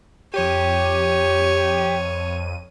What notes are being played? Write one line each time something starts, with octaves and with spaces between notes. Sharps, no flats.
F2 G4 C#5 D#7